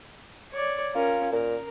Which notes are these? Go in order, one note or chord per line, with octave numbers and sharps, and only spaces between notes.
C#5 D5
C#4 F4 A#4
A#2 A#4